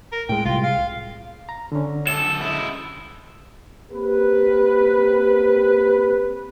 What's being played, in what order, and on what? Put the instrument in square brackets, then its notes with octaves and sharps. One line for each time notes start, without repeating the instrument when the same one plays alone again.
[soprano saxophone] A#4
[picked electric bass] A2 G#3 [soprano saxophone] G5
[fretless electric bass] C2 [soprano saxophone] F4
[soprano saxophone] F5
[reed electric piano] A#5
D3 C#4
[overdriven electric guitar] F#2 A4 [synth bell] E7
[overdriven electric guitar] G#3 E4
[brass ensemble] A#3 C4 G4 A#4 B4